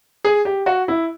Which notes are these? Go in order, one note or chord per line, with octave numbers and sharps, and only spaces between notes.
G#4
G4
F#4
E4